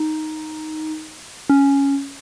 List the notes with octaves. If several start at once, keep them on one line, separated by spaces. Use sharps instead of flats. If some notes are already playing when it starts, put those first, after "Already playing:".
Already playing: D#4
C#4